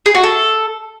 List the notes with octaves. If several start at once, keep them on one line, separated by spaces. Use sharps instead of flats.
G#4
F#4
A4